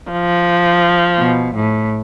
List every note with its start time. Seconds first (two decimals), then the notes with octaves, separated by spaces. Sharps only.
0.11 F3
1.19 B2
1.55 A2